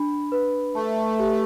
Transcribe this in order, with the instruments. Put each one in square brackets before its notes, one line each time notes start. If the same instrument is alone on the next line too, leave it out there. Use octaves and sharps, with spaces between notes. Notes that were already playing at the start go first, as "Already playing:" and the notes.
Already playing: [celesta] D4 B5
B4
[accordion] A3 [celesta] A5
[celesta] G4